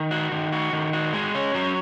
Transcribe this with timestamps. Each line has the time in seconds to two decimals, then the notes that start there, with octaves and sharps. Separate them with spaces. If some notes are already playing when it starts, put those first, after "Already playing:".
Already playing: D#3
0.11 F#4
0.32 D#3
0.52 F#4
0.73 D#3
0.93 F#4
1.13 G#3
1.35 C#4
1.54 F#3